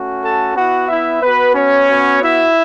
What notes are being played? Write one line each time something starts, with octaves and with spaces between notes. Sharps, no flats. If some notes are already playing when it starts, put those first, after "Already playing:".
Already playing: A3 C#4 F#4
A4 A5
B3 E4 F#4 F#5
E4 E5
B3 F#4 B4
C#4 C#5
B3 F#4
E4 E5